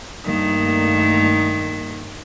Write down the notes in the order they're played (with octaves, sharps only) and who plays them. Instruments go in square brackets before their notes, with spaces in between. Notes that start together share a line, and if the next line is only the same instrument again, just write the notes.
[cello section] G2 A3 A#3 [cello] D#3